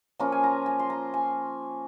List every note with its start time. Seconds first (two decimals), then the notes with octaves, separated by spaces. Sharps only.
0.19 F3 A#3 C#4 F4 A#5
0.32 G#5
0.44 A#5
0.66 G#5
0.79 C6
0.90 A#5
1.14 G#5